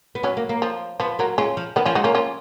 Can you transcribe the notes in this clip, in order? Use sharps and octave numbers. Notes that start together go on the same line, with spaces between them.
B3
F#3 C#4
A#3
A#3
F3
F3 B3
F#3 A#3
G#3 C#4 F4
F3
D#3 B3 D#4
F3 C#4 F4
G#3 D#4 F#4
A#3 C#4 F4
C#4 F4